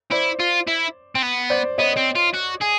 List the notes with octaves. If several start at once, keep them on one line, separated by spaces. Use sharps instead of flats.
E4 C5 D5
F4
E4
C4
B3
C5 D5
B3 C#5 D#5
C4
F4
F#4
G#4